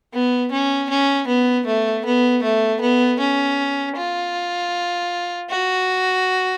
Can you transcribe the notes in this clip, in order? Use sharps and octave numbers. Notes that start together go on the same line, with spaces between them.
B3
C#4
C#4
B3
A3
B3
A3
B3
C#4
F4
F#4